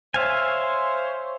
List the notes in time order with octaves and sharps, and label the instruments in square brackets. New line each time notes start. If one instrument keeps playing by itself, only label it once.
[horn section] C5 C#5 [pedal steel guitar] E5 F5 G#5